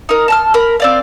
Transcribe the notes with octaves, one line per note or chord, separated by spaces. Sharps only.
D#4 A#4
A5 A#5 F6
A#4 B5
C4 D5 F5